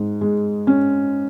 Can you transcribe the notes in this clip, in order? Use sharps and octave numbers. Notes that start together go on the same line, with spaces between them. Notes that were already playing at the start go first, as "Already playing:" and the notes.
Already playing: G#2
G#3
C#4